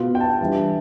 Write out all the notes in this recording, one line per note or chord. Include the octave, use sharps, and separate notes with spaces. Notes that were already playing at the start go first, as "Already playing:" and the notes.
Already playing: B2 B3 F4
G5
A5
E3 G3 D4